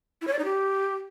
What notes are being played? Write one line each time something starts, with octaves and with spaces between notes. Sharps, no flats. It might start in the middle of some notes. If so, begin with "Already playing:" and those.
E4
C#5
D5
D#4
G4